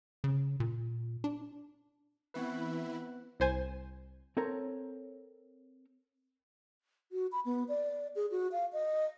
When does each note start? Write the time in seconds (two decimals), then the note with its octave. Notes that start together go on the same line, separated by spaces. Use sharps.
0.24 C#3
0.60 A#2
1.24 D4
2.34 E3 B3 C4 E4 B4 B5
3.40 C2 C5 G#5
4.37 C4 A4 A#4 C#5 A#5
7.12 F#4
7.32 B5
7.45 B3
7.69 D5
8.16 G#4
8.31 F#4
8.52 F5
8.73 D#5